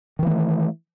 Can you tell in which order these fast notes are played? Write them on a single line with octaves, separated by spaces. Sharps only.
D#3 E3 A#3 A3